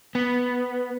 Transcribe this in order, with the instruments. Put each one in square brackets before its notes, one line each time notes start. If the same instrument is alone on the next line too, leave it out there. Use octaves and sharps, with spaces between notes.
[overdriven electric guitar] B3